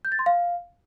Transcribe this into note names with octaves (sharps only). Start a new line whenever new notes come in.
G6
A6
C6
F5